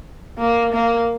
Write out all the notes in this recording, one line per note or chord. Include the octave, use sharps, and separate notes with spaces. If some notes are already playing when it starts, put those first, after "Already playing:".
A#3
A#3